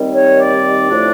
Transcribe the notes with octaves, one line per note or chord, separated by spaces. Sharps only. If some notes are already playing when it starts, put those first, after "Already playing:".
Already playing: D#2 D#3 G3 C4
C#5
D5
A2 F3 A3 D4